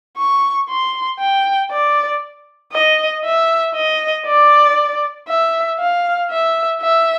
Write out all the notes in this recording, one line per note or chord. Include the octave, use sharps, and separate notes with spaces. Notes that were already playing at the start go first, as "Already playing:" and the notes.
C#6
C6
G5
D5
D#5
E5
D#5
D5
E5
F5
E5
E5